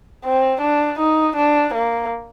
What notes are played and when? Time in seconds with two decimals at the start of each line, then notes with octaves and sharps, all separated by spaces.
0.24 C4
0.61 D4
0.99 D#4
1.36 D4
1.74 A#3